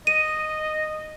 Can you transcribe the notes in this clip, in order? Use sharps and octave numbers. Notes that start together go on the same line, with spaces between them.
D#5 D#7